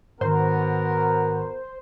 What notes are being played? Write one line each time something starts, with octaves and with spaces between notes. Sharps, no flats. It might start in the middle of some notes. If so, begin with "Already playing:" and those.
G#2 D#3 B3 F#4 A#4 C5